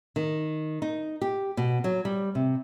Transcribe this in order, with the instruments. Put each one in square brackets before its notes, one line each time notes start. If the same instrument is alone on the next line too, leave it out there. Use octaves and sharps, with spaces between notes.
[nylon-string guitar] D#3
D#4
G4
B2
F#3
G3
C3